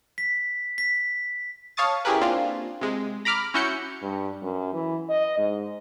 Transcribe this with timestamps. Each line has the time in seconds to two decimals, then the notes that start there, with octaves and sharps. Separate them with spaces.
0.18 B6
0.78 B6
1.77 C#5 F5 A5 C#6 D#6 A6
2.05 C#4 E4 G4 G#4 A#4 B4
2.21 A#3 C4 D4 F4
2.81 C3 G#3
3.25 A#5 B5 D6 F6
3.54 C#4 E4 F#4 G6 C#7
4.03 G2
4.42 F#2
4.74 E3
5.09 D#5
5.38 G#2